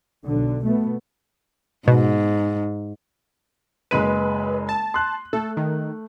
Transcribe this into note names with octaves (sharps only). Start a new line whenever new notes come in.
B1 D3
B2 A3 B3
G#2 B2
F#1 G#3 B4 D#7
A5
C6 F#6
A3 A4
D#3